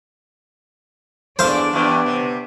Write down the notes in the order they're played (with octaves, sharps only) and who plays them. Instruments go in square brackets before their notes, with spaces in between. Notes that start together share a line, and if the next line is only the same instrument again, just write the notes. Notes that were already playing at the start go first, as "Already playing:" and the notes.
[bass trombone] E2 [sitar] A#2 A3 [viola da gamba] D4 D5 [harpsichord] C5 F5
[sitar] G2 E3 [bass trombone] B3
[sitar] C3